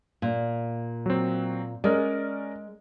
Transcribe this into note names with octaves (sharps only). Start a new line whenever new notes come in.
A#2
F#3 C4
G#3 C#4 A#4 D5